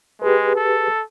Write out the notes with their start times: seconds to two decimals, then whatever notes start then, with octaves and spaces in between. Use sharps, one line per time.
0.22 G#3 G4 G#4 B4
0.55 A4